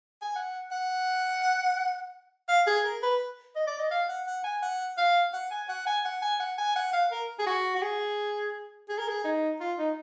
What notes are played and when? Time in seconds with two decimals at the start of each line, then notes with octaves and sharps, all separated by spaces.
0.22 G#5
0.36 F#5
0.71 F#5
2.49 F5
2.67 G#4
2.85 A#4
3.02 B4
3.56 D#5
3.67 D5
3.79 D#5
3.91 F5
4.09 F#5
4.27 F#5
4.44 G#5
4.62 F#5
4.97 F5
5.33 F#5
5.51 G#5
5.69 F#5
5.87 G#5
6.05 F#5
6.22 G#5
6.40 F#5
6.58 G#5
6.76 F#5
6.93 F5
7.11 A#4
7.39 G#4
7.47 F#4
7.75 F#4
7.82 G#4
8.89 G#4
8.98 A#4
9.08 G#4
9.24 D#4
9.60 F4
9.78 D#4